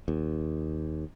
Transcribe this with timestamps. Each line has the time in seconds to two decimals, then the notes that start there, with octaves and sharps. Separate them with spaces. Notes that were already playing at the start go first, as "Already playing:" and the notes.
0.08 D#2